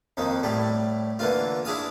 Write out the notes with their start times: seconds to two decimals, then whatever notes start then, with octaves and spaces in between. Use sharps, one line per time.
0.17 F2 D#3 A#3
0.43 A2 G3 A3
1.19 D3 E3 A#3 F4
1.65 D4 E4 G#4 F5 D#6